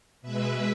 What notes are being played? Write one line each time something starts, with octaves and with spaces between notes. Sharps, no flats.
B2 G#3 B4 E5